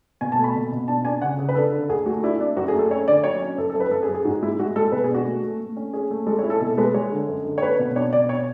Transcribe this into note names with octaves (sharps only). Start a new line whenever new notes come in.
B2 G#5
A5
A3
B5
B2
B2
D4 A5
D4 G#5
C#3 F#5
C#3
B4
D4 A4
D3
D2 G#4
A3 F#4
F#4
D4 E4
D4
F#2 F#4
G#4
A3 A4
C#4 C#5
D3 D5
F#3 C#5
C#4
F#2 A4
A4
F#2
B4
F#2 A4
G#4
F#2
G#4
G#2 F#4
G#3 E4
G#3 F#4
G#3 A4
B2 B4
G#4
D4 F#4
A3
A3
A3
C#4
C#4 G#4
A3
G#3 A4
C#5
E4
A4
B2 A4
A4
G#3 B4
G#3 C#5
D3
F#2
D3
C#5
D4 B4
B2
D4 C#5
B2 D5
C#5